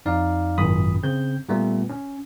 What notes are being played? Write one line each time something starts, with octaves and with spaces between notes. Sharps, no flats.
F2 D#4 D5 F5
G#1 F#2 A#2 B5 D#6
C#3 C4 G6
A#2 G3 A3 B3
C#4